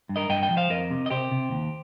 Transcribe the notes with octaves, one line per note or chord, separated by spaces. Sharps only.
G2
A#4 D#5
G2 D#5 G5
D#5 G5
F3
C5 F5
F2 A#4 D#5
C3
D#5
C3 G4 C5
C3
D#2